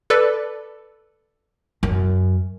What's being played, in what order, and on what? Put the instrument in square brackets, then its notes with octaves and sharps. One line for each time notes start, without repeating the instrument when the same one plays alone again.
[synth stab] A4 B4 D5
[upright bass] F#2